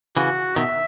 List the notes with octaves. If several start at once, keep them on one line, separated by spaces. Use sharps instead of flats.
C#3 E3 F#4
B2 D#3 E5